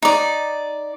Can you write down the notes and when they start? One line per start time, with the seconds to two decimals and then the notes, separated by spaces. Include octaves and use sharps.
0.02 D#4 D5